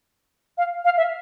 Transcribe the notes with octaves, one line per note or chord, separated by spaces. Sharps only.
F5
F5
E5